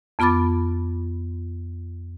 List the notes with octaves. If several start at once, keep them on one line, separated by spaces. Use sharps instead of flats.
F2 B3 F4 B5 D6 A6